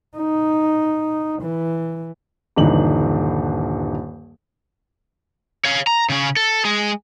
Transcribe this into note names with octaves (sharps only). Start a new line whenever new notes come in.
D#4
E3
D#1 G2 D3 E3 D#4 F#7
C#5 F5
A#5
C#3 C#4
A4
G#3 G#4